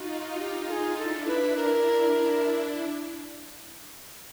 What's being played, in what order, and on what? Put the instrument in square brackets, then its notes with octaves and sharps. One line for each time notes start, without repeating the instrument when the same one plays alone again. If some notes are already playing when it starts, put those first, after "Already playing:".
Already playing: [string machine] D#4 F4 [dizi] F#4
[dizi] G4
A4
G#4
[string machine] D4 E4 [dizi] A4
[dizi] B4
A#4
[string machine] D4 E4